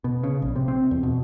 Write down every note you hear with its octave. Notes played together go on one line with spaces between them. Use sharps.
B2
C#3
A#1
C3
C4
E2
B2